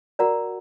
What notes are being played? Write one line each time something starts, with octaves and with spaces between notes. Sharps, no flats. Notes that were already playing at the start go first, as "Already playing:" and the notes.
F#4 A#4 D5 F#5 A#5